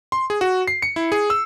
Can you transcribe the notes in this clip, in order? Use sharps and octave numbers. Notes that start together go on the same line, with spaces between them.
C6
G#4
F#4
C7
C#7
E4
G#4
E6